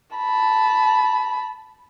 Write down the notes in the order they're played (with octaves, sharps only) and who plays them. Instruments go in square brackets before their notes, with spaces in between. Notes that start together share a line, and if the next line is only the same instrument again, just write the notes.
[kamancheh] A5 B5